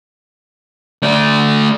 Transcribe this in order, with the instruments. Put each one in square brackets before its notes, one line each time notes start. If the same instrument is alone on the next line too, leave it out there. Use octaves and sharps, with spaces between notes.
[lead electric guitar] A3 D5